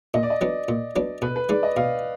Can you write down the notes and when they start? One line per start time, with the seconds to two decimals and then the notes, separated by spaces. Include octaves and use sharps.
0.14 A#2 D#5
0.23 D5
0.30 D#5
0.41 F#3 B3 D4
0.69 A#2
0.96 F#3 B3 D4
1.22 B2 B4
1.36 B4
1.49 G#3 D#4 D5
1.63 D#5
1.76 B2 F5